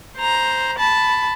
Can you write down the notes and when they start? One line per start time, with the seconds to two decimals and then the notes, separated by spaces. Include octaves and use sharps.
0.18 C5 A#5
0.78 A5 B5